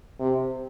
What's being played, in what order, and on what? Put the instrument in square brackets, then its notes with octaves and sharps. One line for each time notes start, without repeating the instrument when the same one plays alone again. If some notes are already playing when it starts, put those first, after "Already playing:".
[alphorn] C3